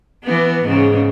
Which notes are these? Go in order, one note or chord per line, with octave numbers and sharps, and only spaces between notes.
E3 B3
G#2 C#3